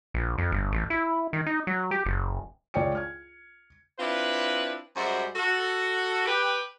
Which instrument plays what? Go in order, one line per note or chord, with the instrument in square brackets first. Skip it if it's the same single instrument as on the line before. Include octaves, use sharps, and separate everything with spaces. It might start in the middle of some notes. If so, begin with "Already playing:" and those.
[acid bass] A#1
F2
G1
A1
E4
D#3
D#4
F#3
G4
F#1
[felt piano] C#2 C#5 D5 G5 C#7
F6 G#6
[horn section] C4 D4 E4 F4 B4
F#2 G3 G#3 F#4 C5 E5
F#4 A4
G4 B4 G5